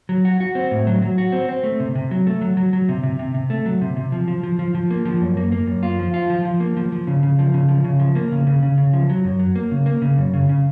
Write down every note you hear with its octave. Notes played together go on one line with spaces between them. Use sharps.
F#3
F#4
F#4
C4
A2
F#3
F#3
F#4
C4
C4
A3
C3
C3
F#3
A3
F#3
F#3
F#3
C3
C3
C3
C3
A3
F#3
C3
C3
F3
F3
F3
F3
F3
A#3
F3
F#2
A#3
A#3
F#2
F4
F3
F4
F3
F3
A#3
F3
F3
C#3
C#3
F3
C#3
F3
C#3
F3
A#3
C#3
C#3
C#3
C#3
F3
F#3
F#2
F#3
A#3
C#3
A#3
C#3
F#2
C#3
C#3